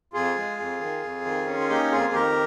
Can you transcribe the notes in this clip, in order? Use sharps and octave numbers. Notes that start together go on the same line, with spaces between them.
F2 F4 G#4
G#3
F2
D#3
F2
D#3
C#4
F4
A#3 D#4 G4
F2 F4 G#4
D#3 G4 A#4